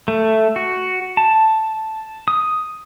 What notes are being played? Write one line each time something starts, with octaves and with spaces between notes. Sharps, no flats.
A3
F#4
A5
D#6